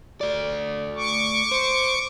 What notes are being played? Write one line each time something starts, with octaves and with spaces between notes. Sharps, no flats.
A3 D5
C#6 D6
C5